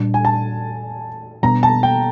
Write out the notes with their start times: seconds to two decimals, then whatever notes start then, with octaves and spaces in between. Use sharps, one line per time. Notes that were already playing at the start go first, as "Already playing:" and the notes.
Already playing: A#2 G3 D4
0.14 G#5
0.25 A5
1.43 B2 G3 B3 D4 A#5
1.63 A5
1.83 G5